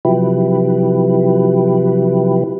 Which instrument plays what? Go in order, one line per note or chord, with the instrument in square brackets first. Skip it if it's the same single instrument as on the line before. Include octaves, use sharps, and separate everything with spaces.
[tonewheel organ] C3 F3 F#3 E4 G4 B4